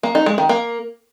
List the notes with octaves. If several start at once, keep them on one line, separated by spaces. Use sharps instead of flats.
A#3
D#4
G#3
D#3
A#3